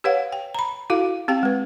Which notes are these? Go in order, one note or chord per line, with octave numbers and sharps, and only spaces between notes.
G4 B4 C#5 F5 F#5
G5
A#5 B5
E4 F#4 A4 F5
C4 G4 F5 G5
G#3 B4